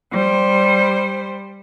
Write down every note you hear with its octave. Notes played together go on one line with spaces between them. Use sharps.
G3 C5